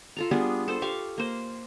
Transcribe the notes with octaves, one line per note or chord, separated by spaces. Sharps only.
F4 A4 A#5
G3 B3 D4 G#4
A4 C5
G4 F5 C#6
A#3 C5